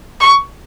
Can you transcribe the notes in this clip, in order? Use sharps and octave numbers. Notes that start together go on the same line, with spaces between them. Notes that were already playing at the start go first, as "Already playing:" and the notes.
C#6